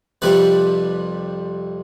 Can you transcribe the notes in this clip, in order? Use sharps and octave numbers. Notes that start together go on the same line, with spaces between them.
F2 C3 G3 B4 D5